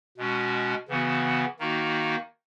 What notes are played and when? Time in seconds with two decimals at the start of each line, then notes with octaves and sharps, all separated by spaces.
0.18 B2 G#3 C#4 F#4
0.88 C#3 E3 B3 F#4
1.59 D#3 A#3 D#4 F#4